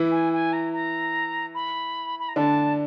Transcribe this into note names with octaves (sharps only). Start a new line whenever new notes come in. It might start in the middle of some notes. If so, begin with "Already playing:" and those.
Already playing: E3 E4
G#5
G#5
A#5
A#5
B5
B5
A#5
D3 D4 A5